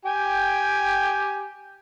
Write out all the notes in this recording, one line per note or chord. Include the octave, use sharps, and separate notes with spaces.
G4 G5 G#5